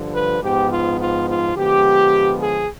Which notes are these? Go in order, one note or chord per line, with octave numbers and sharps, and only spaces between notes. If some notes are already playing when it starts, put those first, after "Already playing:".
Already playing: G2 D3 F3
B4
G#2 F3 B3 G4
F4
F4
F4
D3 F3 G#3 B3 G4
G#4